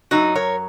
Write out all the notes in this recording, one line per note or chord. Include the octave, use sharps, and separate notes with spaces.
F#2 D#3 F#3 D#4 F#4
A#4 C#5